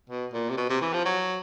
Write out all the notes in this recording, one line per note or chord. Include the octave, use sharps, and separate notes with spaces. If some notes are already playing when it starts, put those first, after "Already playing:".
B2
A#2
C3
B2
C3
E3
F3
F#3